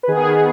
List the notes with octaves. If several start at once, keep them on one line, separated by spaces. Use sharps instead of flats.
B4
D#3 B3 G#4